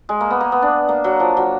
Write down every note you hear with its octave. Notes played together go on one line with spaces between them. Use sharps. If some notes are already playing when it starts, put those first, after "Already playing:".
G#3
A#3
B3
A#3
B3
D4
A#3
F#3
F3
F#3